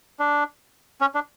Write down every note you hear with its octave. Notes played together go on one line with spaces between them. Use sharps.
D4
C#4
D4